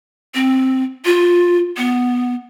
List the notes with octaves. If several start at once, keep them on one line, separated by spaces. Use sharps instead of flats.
C4
F4
B3